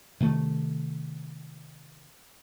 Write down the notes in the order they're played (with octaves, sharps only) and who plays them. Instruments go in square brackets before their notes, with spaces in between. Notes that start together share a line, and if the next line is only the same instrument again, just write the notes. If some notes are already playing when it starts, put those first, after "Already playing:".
[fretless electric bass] C3 D#3 A3